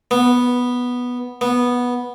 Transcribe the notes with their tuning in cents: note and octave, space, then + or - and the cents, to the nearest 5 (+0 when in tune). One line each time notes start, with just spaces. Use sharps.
B3 -5
B3 -10